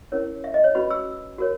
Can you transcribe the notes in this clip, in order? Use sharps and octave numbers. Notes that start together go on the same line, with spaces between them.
C#4 E4 A#4 C#5
E5
D#5
C#5
C#4 F#4 B4 B5
E6
F#4 A#4 C#5